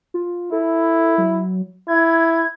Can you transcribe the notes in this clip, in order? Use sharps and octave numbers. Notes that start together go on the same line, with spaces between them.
F4
E4 A4
F#3
E4 G#6